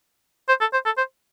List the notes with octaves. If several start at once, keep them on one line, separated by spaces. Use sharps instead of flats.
C5
A4
C5
A4
C5